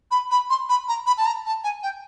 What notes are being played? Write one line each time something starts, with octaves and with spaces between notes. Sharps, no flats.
B5
B5
C6
B5
A#5
B5
A5
A#5
A5
G#5
G5